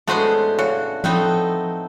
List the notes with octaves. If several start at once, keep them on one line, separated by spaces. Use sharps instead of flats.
A2 G#3 A3 B3 C#4 D4 F#4 C5
C#3 F#4
F3 A3 B3 C4 D#4